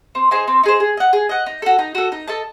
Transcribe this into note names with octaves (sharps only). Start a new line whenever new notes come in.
C4
D#4 G#4 C5
C4
D#4 G#4 C5
G#4
D#5 F#5
G#4
D#5 F#5
D#4
F#4 A4
D#4
F#4 A4
D#4
A4 D#5 A5